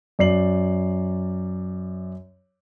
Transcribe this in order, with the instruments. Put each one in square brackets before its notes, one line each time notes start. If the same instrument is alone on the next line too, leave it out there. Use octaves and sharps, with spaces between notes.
[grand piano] F#2 D5 C7 F#7